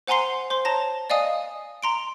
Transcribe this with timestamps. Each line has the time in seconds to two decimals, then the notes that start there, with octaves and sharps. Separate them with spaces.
0.07 C5 F#5 G#5 A#5 C6 C7
0.50 C5 C6
0.65 C#5 A5 A#5 A#6
1.10 D5 D#5 F5 G#5 D#6
1.83 A#5 C6 D7